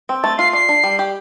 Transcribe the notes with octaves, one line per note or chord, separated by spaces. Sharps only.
C4
A3 A6
F4 C7
D5 C7
D4
G3
G4